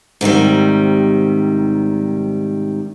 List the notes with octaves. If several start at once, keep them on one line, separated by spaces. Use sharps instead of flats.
G#2 C3 D#3 G3